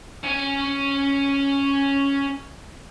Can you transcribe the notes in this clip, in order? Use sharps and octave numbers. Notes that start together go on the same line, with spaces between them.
C#4 G#5